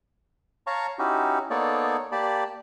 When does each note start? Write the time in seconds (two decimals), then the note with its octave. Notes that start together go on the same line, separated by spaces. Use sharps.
0.67 C#5 F5 A5 A#5 C#6
0.99 C#4 D#4 E4 F#4 G4
1.50 A#3 B3 D#4 A4 C#5 D5
2.12 A#3 G4 D5 A5 B5